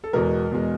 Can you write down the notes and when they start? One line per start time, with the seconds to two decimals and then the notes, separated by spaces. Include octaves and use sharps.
0.04 A4
0.13 E2 B2 G#3 A#4
0.51 E2 B2 G#3